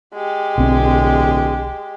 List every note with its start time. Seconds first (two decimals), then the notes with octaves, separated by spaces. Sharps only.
0.14 G#3 G4
0.58 D1 B1 C4